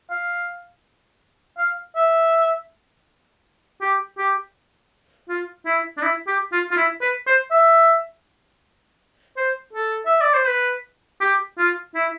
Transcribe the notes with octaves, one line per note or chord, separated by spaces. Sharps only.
F5
F5
E5
G4
G4
F4
E4
D4
E4
G4
F4
F4
E4
B4
C5
E5
C5
A4
E5
D5
C5
B4
G4
F4
E4